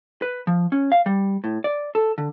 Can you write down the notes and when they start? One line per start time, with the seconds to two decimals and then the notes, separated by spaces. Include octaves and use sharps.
0.22 B4
0.47 F3
0.72 C#4
0.92 F5
1.06 G3
1.44 A2
1.64 D5
1.95 A4
2.18 D3